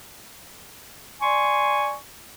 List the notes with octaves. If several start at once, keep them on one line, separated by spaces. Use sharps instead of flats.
D5 G#5 C6 C#6